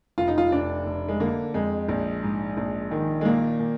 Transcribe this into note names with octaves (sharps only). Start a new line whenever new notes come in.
F1 F4
D#4
F4
F1 D4
F1
G#3
D3 A#3
F2 G#3
A#1
G#2
A#1
D#3
G#3
A#2 A#3
A#2